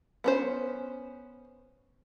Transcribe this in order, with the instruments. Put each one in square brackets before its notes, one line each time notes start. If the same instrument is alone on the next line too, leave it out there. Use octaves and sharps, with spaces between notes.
[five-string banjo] B3 C#4 C5